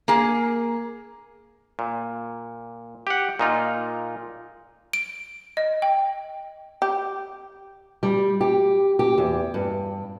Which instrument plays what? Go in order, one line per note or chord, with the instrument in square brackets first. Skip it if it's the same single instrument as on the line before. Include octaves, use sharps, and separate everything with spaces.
[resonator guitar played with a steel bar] A#3 G#4
[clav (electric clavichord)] A#2
G4 F#5
A#2 D#4 F4
[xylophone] D7
D#5
G5
[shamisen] G4
[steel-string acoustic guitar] G3
G4
G4
E2
G2